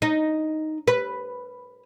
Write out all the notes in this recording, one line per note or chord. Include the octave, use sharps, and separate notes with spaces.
D#4
B4